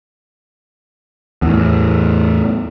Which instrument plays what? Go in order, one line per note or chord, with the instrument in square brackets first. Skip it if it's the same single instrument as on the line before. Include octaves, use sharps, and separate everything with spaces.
[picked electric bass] E2 A2